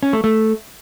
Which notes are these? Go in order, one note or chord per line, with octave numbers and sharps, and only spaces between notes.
C#4
A3
A3